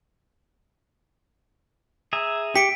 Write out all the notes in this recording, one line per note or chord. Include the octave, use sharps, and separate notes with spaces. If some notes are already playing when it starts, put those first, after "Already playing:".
G#4 E5 A#5
G4 B6 C#7 D7